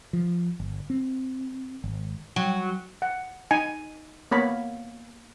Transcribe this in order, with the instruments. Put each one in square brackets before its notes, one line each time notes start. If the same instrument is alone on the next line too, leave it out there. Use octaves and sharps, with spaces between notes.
[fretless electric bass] F3
G1
C4
G#1
[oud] F#3
[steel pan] F#5
D#4 G#5
A#3 B3 C#5 B5